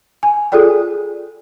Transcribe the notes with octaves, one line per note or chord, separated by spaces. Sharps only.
G#5
F4 G#4 A4 D5 G5